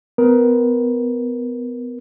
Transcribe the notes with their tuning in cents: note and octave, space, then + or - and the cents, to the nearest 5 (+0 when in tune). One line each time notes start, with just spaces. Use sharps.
B3 +25 A#4 +15